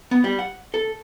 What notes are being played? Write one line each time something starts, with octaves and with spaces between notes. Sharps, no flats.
B3
G3
F#5
A4